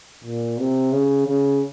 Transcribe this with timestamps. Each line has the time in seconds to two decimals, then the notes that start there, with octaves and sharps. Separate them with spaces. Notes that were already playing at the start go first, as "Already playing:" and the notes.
0.24 A#2
0.59 C3
0.92 C#3
1.27 C#3